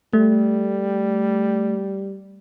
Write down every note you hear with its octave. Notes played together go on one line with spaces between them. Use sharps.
G3 A3